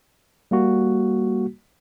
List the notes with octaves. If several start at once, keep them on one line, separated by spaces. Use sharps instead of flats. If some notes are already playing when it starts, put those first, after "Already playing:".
G3 A#3 F#4